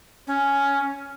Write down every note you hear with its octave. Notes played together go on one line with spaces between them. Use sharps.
C#4